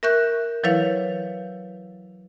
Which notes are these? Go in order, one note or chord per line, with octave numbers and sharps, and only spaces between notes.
A#4 E5 C#6 F#6 G6
E3 F#3 E4 B4 C#5 F5